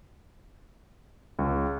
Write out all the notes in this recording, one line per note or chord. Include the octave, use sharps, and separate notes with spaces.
C#2